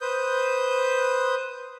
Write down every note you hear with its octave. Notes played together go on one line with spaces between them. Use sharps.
B4 C5 D#6 G6